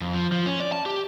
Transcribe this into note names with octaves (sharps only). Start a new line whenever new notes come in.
F2
F3
F3
C#4
D5
A5
G4